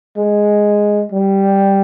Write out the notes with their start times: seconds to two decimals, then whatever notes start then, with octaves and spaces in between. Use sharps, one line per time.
0.18 G#3
1.12 G3